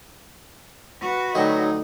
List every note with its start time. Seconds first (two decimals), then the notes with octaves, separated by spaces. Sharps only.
1.01 F#4 B4
1.35 D2 F#3 D#4 D#5 G5